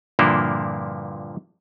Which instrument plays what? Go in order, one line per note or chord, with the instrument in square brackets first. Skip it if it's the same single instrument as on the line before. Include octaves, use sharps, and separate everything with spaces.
[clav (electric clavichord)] G2 A#2 D3 F3 A#3 E4